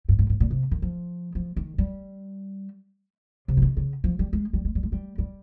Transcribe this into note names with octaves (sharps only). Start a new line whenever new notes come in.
G2
G#2
G#2
A#2
C3
D#3
F3
F3
D#3
G3
C3
F3
D#3
C#3
F3
G3
G#3
G3
G#3
G3
G#3
G3
G3